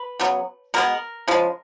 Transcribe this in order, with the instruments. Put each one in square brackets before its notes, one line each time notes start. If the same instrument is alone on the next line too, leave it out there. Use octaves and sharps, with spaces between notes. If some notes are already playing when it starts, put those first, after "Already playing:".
Already playing: [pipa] B4
C#3 F#3 B3
B2 G#3 B3 A#4
C#3 F3 G#3